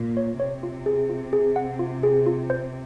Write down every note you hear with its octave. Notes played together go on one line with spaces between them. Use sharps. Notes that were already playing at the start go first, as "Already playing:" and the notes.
Already playing: A#2
C#5
C3 C#5
F4
G#4
F4
G#4
F#5
F4
G#4
F4
C5